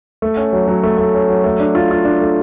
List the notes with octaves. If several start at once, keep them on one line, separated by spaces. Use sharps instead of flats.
A3
C#4
F#3
F#3
A3
A3
C#4
F#3
A3
D4
F4
F4
D4
A3